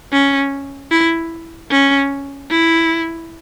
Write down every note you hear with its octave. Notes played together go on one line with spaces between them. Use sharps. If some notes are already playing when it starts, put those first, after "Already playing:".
C#4
E4
C#4
E4